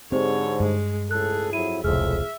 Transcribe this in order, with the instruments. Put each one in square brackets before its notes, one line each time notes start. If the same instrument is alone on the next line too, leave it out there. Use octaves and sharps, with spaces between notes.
[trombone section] G#2 D3 [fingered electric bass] C4 [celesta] G4 G#4 C5 [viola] C#5
[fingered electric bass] G2 [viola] G#3
[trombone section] C#2 A2 A4 [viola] G#4 [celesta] F#6
[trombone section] F2 F#3 E4 [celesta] D#7
[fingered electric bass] E1 C2 [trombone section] F2 A2 G#3 [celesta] G#4 F6 [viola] E5